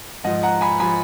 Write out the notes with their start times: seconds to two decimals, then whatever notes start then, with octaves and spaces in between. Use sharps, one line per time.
0.24 G#2 F3 D#5 F#5
0.43 F#5 A#5
0.61 G#5 B5
0.80 F3 G#5 B5